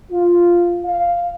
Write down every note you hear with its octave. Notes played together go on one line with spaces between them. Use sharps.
F4
F5